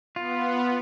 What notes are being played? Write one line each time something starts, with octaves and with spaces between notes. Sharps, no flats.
B3 F4